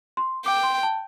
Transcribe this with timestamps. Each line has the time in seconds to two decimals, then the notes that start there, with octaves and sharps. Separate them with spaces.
0.17 C6
0.46 G5 D6
0.63 C6
0.83 A5